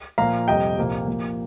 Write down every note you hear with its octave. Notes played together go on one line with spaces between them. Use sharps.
A#2 F3 A#3 F5 A#5
F2 C3 G3 D#5 G5
C2 A#2 F3 A#3
A#2 F3 A#3